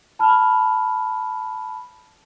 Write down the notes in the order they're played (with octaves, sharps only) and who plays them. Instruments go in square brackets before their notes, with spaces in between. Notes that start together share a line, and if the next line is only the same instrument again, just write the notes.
[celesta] A5 B5 F6